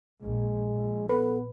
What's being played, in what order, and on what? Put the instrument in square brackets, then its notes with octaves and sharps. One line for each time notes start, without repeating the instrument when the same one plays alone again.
[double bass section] A#1 [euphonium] G#3
[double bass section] A#1
[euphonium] B3 [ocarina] A4 [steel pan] B4